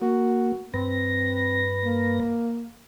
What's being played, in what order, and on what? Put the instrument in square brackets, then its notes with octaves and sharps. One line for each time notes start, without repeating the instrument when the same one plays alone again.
[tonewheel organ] A#3 [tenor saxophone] F#4
[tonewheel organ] G2 B4 A#6 [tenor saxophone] C4
[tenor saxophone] A#3